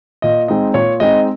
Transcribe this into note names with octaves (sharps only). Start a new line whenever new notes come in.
A#2 D#5
G#3 C4 D#4 D#5
A#2 C#5
G#3 C4 D#4 D#5